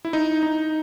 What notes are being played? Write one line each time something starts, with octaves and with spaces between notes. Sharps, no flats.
E4
D#4
D#4